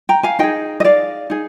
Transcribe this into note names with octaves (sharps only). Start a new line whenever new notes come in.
G5 A#5
F5 G#5
D#4 G#4 D#5 G5
D#5
D5 F5
D#4 G#4